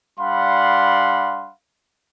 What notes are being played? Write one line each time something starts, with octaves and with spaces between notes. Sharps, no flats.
G3 D4 F5 F#5 B5 C6